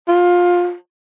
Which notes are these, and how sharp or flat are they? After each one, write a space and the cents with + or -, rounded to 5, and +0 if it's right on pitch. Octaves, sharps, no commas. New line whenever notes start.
F4 +20